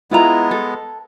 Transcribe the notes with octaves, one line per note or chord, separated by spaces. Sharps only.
G#3 B3 E4 F4 A#5
A4